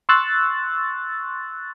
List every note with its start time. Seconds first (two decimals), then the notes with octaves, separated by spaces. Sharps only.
0.09 C6 C#6 E6 F#6 A6